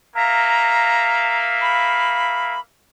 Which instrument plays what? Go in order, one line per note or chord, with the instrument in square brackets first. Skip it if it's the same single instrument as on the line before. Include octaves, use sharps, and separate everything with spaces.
[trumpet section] A#3 E5 F5 [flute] A#5
[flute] B5